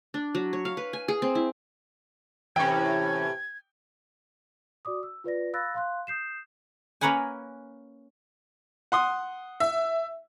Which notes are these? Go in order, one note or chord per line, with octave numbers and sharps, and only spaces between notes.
D4
F#3
C#5
F5
B4
G#5
G#4
C4
E4
A2 C3 E3 C#4 G5 G#6
F#4 D5 D6 D#6
E6
F4 B4 D5 A#6
F5 B5 E6 F#6 A6 A#6
F5 C6 F#6
D#6 G6 C7 E7
A#3 C#4 A#4 B4 F#5 G#5
F#5 C6 D#6
E5